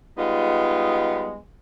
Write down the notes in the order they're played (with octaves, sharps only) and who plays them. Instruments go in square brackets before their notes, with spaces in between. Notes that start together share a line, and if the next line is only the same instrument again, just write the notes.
[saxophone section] G3 G#3 B3 D#4 F4